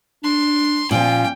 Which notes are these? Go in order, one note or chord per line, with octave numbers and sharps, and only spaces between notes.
D4 C6
A#2 F3 C#4 G5